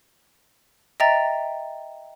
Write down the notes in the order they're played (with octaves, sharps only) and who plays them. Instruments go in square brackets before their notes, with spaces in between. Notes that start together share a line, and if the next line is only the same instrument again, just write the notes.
[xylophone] D#5 E5 G5 A#5 A6